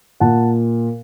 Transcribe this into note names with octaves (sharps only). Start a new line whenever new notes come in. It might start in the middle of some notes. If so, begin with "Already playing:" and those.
A#2 F#5 A5